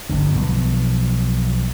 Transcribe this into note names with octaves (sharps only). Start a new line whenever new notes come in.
G1 F2 D3
B1 F3 B3